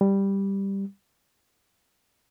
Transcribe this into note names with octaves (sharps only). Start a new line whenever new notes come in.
G3